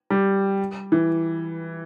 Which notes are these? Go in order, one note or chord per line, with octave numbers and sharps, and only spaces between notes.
G3
E3